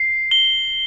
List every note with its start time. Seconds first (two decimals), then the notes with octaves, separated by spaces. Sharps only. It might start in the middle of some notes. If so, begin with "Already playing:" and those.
Already playing: C7
0.31 G7